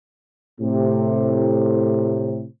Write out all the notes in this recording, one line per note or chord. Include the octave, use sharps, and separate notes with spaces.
A2 C3